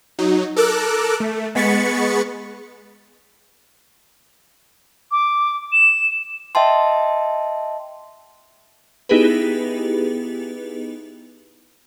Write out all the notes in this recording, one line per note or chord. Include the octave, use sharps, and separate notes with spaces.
F#3 D#4
A4 A#4 D6 E6 F#6
A3
G#3 B3 B5 C#6 A6 C#7
D6
E7
D#5 E5 G5 A5 C6
B3 D#4 E4 G4 G#4 B4